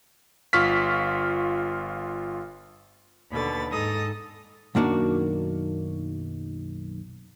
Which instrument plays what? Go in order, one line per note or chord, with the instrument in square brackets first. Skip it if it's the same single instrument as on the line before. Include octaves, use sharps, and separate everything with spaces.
[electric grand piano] G1 F4 C#6 F6 B6
[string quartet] D#2 B2 D3 B5 A6
G#2 D#4 A4 D#6 A#6
[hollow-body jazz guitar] B1 F#2 D#3 A#3 D4 F#4